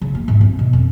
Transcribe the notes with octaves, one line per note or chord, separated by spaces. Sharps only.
C#3
A#3
G#2
C4
B2
F2